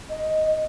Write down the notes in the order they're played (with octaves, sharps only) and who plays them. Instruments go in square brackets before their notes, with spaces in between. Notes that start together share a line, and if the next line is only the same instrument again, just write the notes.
[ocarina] D#5